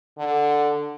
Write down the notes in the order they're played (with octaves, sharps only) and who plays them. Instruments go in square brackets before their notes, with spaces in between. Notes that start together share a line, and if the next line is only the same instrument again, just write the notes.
[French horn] D3